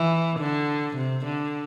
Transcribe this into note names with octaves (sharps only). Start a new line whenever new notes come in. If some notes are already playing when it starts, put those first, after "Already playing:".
Already playing: E3
D3
C3
D3